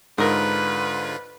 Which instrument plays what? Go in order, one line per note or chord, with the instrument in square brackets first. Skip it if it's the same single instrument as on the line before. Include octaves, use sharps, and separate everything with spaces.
[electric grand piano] G#2 [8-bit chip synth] D3 F4 [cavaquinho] A#4 D#6 [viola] B4